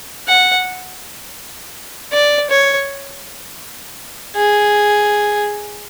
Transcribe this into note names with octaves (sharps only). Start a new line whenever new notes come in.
F#5
D5
C#5
G#4